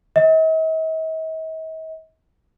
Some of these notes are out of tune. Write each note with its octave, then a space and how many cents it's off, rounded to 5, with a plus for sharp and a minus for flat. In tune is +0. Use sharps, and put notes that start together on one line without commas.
D#5 +45